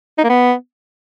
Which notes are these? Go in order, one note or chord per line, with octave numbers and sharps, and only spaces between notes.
D#4
A#3
B3